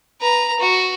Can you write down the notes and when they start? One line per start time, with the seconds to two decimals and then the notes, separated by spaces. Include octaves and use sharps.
0.21 B4 A#5
0.60 F#4